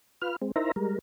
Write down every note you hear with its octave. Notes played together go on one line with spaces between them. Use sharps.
F4 B4 F6
G#3 C4
D#4 E4 A#4 C5 E5 A#5
G3 G#3 A#4